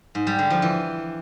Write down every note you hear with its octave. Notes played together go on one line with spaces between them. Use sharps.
G#2
G3
D3
F3
E3